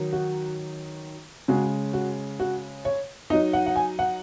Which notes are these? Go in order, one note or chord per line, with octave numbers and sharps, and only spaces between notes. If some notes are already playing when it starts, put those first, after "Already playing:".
Already playing: D#3 F#3 D#4
F#4
C#3 G#3 C#4 F#4
F#4
F#4
C#5
F#3 D#4 D#5
F#5
F#5
G#5
F#5